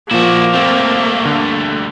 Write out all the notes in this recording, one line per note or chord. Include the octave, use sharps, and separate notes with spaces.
A#2 F3 A#3 E4 F#4
G3 A3 C4
D3